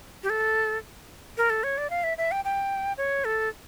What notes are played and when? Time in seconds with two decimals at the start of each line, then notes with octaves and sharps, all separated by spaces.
0.23 G4
0.29 A4
1.37 A#4
1.50 A4
1.63 C#5
1.78 D5
1.90 F5
2.03 E5
2.18 E5
2.31 G5
2.45 G5
2.97 C#5
3.25 A4